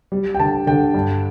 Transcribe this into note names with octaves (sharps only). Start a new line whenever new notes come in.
G3
G5
D3 A5
D3 G5
G2